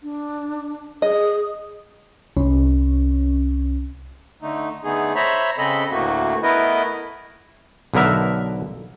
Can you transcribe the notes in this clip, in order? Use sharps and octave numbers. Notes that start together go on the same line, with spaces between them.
D4
G#4 D#5
C2 C#4
D3 A3 D#4
D3 A3 B3 D#4 G#4
C5 C#5 E5 A#5 B5
C#3 C4 A4 D#5 B5
D2 A2 A3 A#3 F#4
A3 B3 E4 A#4 B4 D#5
B1 D3 B3 A#4 E5